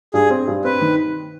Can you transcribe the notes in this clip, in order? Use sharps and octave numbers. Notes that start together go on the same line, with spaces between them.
G2 G#4
C4
G2
C4 B4
D#3